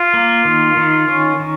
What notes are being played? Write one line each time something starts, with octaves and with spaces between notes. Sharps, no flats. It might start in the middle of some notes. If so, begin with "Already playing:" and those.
Already playing: F4
A#3
D#3
D#3
C#4
D#3